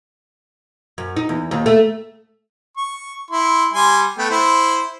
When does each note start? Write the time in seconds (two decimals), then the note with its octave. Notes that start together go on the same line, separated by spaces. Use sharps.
0.98 F#2
1.17 D#4
1.29 E2
1.51 D#2
1.66 A3
2.77 C#6
3.31 E4 C6
3.73 G3 G#5 C6
4.18 A3 B3 G5
4.30 E4 C5